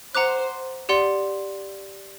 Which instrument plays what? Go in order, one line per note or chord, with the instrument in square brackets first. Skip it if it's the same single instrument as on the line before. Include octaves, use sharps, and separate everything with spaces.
[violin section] C5 [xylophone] F#5 A#5 D6 F#6
[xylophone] G4 D5 F#5 C6